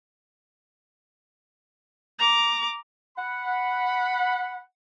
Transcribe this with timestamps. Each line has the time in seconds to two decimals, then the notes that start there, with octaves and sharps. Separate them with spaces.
2.19 A#5 D6
3.17 F#5 B5